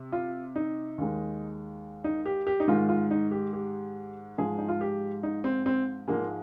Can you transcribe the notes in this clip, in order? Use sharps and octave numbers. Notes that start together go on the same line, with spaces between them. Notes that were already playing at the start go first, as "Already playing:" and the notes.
Already playing: C3
F4
D#4
D#2 D#3 G#3
D#4
G4
G4
D#4
G#2 D#3 G#3 F4
F4
D#4
G4
G4
G#2 F3 G#3 G#4
D#4
F4
G4
D#4
C4
C4
G#2 F3 G#3 A#3